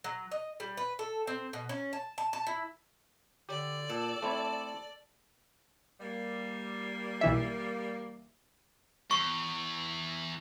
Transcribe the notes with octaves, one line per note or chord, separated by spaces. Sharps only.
F#3
D#5
G3
B4
A4
C4
B2
C#4
A5
A5
A5
E4
D3 G4 D5
A#2 A4 G5 D6 E6
A3 C4 E4
G3 A#3
B1 E3 E5
E2 C#6